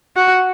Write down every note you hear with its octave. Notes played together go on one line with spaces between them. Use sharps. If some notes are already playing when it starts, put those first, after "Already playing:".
F#4